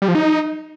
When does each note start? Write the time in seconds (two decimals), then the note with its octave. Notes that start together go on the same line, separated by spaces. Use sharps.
0.02 G3
0.08 F3
0.15 D#4